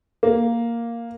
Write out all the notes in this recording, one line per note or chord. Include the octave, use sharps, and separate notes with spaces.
A#3